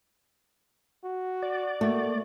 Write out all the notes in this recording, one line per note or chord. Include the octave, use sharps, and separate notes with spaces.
F#4
D5
A3 A#3 F#4